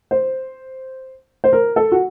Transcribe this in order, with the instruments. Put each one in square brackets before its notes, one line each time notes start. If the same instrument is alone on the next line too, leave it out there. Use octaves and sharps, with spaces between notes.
[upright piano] C5
C5
A#4
A4
F#4